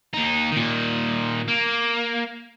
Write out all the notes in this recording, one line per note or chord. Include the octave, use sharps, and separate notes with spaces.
D#2 D#4
A#2 D#3
A#3